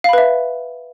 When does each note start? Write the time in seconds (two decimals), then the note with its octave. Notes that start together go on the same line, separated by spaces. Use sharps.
0.04 F5
0.09 B5
0.13 B4
0.18 E5